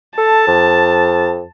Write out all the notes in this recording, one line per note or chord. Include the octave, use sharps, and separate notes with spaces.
A4 A5
F2